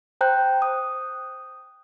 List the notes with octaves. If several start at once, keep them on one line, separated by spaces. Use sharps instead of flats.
C5 G5 A#5 F#6 G6
D#6